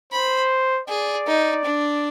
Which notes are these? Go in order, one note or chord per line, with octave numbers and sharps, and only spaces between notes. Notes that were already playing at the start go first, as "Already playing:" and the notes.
C5 B5
G#4 D5
D#4
D4